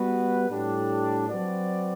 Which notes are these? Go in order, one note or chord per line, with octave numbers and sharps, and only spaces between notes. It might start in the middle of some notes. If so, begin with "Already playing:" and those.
Already playing: G3 B3 F#4 B4
A2 G3 D4 G4
F#3 C4 F#4 B4 D5